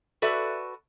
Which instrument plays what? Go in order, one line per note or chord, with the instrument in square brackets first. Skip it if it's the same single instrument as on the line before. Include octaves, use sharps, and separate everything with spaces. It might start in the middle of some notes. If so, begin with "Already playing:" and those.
[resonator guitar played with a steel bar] F#4 A4 B4 D5 E5